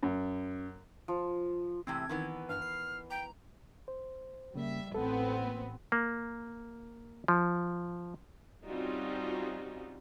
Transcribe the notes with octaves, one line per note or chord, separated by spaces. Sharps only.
F#2
F3
E2 A2 C3 C4 G#6
D#3 E3 B3
G2 F6
C7
G5 A#5
C5
C#3 G3 A#3 E5
A1 B3 C4 A4
A#3
A#3
F3
G3 C4 C#4 D#4 F4 F#4